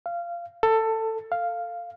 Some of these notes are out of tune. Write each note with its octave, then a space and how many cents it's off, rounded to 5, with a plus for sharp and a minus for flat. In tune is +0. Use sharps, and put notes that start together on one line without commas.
F5 -20
A4 +15
F5 -5